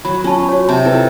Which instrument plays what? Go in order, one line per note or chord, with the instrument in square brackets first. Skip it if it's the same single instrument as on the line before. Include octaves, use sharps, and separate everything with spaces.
[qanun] F#3 [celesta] B5
[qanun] C#4 [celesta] F4 A5
[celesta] F#4 C#5
[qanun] C3 [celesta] A5
[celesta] E4 F4 B4 [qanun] A4